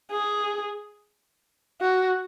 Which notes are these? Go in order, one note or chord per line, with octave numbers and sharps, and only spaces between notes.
G#4
F#4